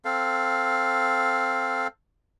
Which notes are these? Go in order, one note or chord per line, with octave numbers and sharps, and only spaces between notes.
C4 A4 F5